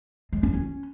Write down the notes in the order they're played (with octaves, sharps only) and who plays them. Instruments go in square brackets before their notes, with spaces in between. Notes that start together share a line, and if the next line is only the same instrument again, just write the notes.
[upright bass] G#3
C#4
C#4